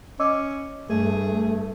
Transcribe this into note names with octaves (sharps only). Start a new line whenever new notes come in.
C#4 D#5 D6 E6
G2 A3 G#4